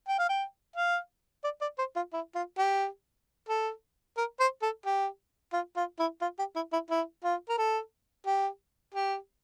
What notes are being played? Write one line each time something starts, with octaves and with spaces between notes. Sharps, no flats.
G5
F5
G5
F5
D5
D5
C5
F4
E4
F4
G4
A4
A#4
C5
A4
G4
F4
F4
E4
F4
G4
E4
E4
E4
F4
A#4
A4
G4
G4